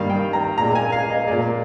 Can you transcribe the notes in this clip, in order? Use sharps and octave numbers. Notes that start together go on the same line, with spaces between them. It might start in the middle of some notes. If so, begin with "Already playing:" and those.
Already playing: G2 D#3 G3 A#3 F5
G5
A#5
A#2 G#3 A#5
G#5
F5
D#5
A#2 G#3 D5